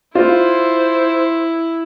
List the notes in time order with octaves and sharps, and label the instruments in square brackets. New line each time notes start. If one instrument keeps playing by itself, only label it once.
[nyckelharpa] E4 [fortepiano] F4 [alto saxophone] C5